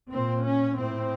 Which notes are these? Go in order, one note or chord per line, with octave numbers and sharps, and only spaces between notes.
A#2 C4
C#4
A2 C4